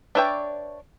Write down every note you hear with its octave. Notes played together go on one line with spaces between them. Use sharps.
D4 B4 C#5 D5 E5 G5